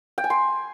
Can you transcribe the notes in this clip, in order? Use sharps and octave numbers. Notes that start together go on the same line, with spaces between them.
G5
G#5
C6